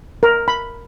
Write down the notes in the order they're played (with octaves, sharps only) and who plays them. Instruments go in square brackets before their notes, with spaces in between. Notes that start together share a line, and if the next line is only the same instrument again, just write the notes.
[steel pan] A#4
B5